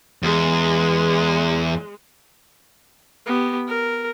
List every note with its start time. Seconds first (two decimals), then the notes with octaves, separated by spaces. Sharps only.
0.23 E2 G#3
3.26 B3 G4
3.67 A#4